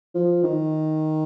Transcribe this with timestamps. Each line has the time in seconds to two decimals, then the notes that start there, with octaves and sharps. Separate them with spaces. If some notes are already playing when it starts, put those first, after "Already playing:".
0.15 F3
0.44 D#3